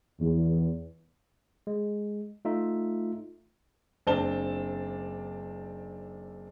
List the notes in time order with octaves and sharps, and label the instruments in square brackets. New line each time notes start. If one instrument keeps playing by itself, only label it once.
[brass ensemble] E2
[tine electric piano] G#3
A3 D#4 F4 E5
[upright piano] F#1 C4 D4 A5 G7